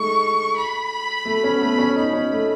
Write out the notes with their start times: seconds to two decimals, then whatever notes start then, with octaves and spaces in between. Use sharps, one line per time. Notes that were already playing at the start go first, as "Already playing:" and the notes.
Already playing: G#3 A3 D#4 C#6
0.56 B5
1.25 A3
1.44 C#4
1.55 B3
1.61 A3
1.78 C#4
1.96 D#4 B5
2.13 C#4
2.31 A3